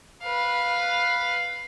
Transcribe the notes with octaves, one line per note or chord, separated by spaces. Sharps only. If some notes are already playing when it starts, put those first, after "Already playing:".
B4 F5